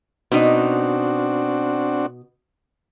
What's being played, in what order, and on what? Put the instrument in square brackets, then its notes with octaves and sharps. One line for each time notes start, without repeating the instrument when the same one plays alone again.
[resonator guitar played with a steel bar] B2 D#4 [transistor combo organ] C4 D4 F#4